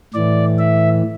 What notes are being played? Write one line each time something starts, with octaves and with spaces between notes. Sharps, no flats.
A2 E3 D5
E5